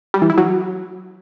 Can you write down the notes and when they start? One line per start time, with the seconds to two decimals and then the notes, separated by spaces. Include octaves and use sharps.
0.14 G3
0.22 E3
0.30 E4
0.38 F#3